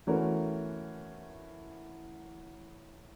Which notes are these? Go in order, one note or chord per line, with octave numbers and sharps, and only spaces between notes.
E3 A3 C#4 F#4 A#4